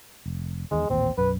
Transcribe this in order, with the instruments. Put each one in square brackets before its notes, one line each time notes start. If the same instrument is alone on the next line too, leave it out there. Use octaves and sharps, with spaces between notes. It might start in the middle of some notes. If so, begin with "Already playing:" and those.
[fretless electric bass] F1
[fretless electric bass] E2 D#3 [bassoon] G#3
[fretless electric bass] A1 D#2 A#2 [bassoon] C4
[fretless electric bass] B1 F#2 [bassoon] B4